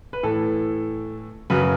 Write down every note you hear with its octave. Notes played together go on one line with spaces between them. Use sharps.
B4
A2 E3 A4
F#2 C#3 F#3 B4